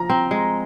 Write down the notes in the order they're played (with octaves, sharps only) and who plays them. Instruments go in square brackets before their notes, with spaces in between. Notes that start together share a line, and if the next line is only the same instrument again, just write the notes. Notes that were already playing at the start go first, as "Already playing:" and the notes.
Already playing: [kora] F3 [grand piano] A#5
[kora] C4
G#3